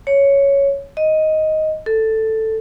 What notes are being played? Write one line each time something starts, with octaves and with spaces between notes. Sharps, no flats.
C#5
D#5
A4